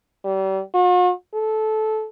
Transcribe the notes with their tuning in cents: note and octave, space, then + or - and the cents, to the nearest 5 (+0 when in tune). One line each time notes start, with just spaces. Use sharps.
G3 -35
F#4 -45
A4 -15